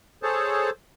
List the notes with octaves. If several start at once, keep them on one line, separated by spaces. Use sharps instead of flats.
G#4 A4 C5 C#5 A5